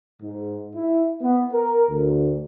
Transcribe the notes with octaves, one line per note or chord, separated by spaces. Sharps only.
G#2
E4
B3
A#4
D2